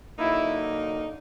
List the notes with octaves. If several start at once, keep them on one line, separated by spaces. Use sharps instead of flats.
D3 F#3 A#3 D#4 E4